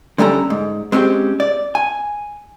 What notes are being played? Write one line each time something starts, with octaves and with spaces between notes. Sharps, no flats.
D3 G3 C#4 A4 G#5 A#5
G#2
G#3 C4 C#4 F#4 G4
D5
G#5